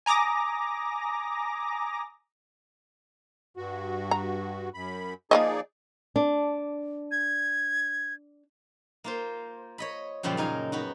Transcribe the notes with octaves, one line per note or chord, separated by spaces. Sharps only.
G#5 A#5 D6 D#6 A#6
G2 F#4
A#5
F#2 B5
F3 A#3 D#4 G#4 D5 D#5
D4
G#6
A#3 F4 C5
C#5 D#5 B5
F#2 A#2 C#3 F3 G3
C#3 D#4 A#4 G#5
B3 D#4 F#4